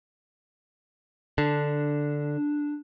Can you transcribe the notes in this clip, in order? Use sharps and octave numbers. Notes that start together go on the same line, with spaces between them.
D3 D4